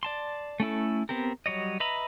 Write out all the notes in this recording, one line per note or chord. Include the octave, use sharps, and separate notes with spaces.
D5 A5 C6
A3 C#4 E4 A4
B3 C4 G4 A#4
F#3 G3 C#5 D#5
B4 D#5 E5 A#5 B5